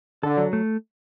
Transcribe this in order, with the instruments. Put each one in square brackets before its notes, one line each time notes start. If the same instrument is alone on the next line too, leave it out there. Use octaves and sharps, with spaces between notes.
[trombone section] D3 [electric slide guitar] A4
[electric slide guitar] F#3
A3